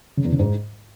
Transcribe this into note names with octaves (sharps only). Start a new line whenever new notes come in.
C#3
E2
C#3
G#2